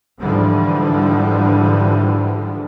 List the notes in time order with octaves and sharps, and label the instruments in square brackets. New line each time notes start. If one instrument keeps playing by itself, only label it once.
[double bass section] G#2 D3 E3 F3 G3